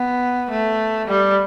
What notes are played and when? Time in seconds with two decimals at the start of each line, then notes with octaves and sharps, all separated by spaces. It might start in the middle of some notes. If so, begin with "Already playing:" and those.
Already playing: B3
0.51 A3
1.08 G3